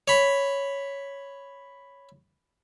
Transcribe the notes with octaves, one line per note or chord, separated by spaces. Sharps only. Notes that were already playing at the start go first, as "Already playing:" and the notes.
C#5 B5